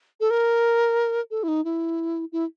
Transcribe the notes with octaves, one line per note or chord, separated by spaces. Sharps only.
A4
A#4
A4
E4
D#4
E4
E4